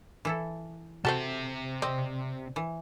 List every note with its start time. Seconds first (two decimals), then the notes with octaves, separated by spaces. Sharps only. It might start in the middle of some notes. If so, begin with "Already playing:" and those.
0.25 E3 E4 A4
1.05 C3 F#4 A4 C5 E5 A5
1.82 C4 D5 D#5
2.56 E3